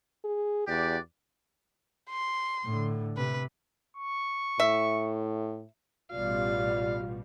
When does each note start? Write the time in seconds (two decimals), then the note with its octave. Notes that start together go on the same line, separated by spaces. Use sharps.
0.24 G#4
0.68 E2 F#4 G4 D5
2.10 C6
2.64 A2 D3
3.17 C3 B4
3.97 C#6
4.60 A2 E5
6.12 A1 B2 G3 F4 D5 F5